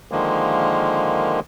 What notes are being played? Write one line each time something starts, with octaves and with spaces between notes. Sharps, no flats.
D3 D#3 F3 G#3 A#3